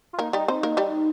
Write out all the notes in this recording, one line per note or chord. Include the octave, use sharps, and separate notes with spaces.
F4
A#3 D#4 A#4
G3 D#4 G4
C4 D#4 C5
A#3 A#4
G3 G4